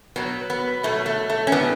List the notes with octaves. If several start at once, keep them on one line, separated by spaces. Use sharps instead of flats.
B2 F#3 B3
B3
B2 F#3 A3
A3
A3
C#4
A2 G3 B3